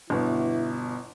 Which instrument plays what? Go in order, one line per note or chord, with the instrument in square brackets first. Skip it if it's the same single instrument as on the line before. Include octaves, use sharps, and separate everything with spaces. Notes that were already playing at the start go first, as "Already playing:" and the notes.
[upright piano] G1 B2 [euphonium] E4